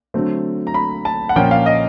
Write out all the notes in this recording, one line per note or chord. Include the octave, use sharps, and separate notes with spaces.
D3 F#3 A3 C4
A#5
B5
A5
F#5
A#2 F3 A#3 C#4 G5
F5
D#5